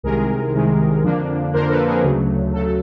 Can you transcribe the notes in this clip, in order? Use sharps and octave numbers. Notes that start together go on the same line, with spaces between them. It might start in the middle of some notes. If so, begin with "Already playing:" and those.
C2 C3 D#3 G#3 G#4 A#4
C2 C3 D#3 G#3
F2 D3 F3 A#3 D4
F2 D3 F3 A#3 D4 A#4 C5
A4 B4
G#4 A#4
D2 C#3 F#3 A3 G#4
D2 C#3 F#3 A3 A4